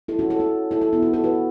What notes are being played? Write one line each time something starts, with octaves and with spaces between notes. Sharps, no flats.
E4 A4
C#4 F#4
E4 A4
C#4 F#4
E4 A4
E4 A4
B3 E4
C#4 F#4
E4 A4
F#4 B4